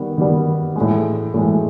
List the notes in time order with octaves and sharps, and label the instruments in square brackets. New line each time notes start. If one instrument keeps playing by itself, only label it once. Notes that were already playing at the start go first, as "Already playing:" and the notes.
Already playing: [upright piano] D#3 G3 B3
D#3 G3 B3
A2 E3 G#3
A2 E3 G#3